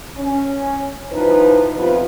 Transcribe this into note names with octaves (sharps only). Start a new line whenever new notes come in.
C#4
D#2 F3 D#4 E4 B4
F2 C3 F3 B3 F4 B4